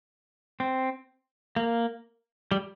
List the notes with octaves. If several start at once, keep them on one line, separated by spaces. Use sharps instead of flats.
C4
A#3
G3